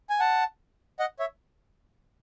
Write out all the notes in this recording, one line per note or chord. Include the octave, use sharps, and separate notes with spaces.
G#5
F#5 A5
D#5 F#5
C#5 E5